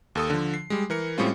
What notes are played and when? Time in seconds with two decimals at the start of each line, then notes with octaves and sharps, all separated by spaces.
0.15 D#2 A4 D#6
0.30 D3 F3
0.54 C7
0.70 G3 G#3
0.90 E3 A#4 C#7
1.18 A2 G3 G#3 C4 C#4 F4